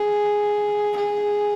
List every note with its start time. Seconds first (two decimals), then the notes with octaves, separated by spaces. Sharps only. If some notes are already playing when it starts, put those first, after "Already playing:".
Already playing: G#4
0.96 G#4